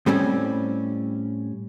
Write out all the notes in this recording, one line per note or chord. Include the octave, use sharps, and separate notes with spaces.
A2 G3 C4 C#4